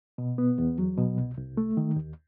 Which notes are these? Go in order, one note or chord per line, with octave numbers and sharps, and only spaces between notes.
B2
B3
E2
F#3
B2
C2
C2
A3
D#3
D#2